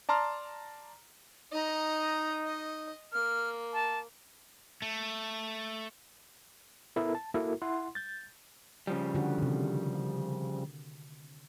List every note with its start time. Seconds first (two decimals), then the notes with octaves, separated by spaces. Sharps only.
0.09 D5 A5 A#5 C6 F6
1.52 D#4 D#5 A#5
2.45 D#5
3.13 A#3 F6
3.73 A5
4.82 A3
6.96 B3 E4 A4 A#4
7.15 A5
7.34 A#3 E4 F#4 A4 A#4
7.62 E4 F#5 C6
7.95 G6 A6
8.87 C#3 F3 G3
9.15 D3 F#4
9.38 C3 D#3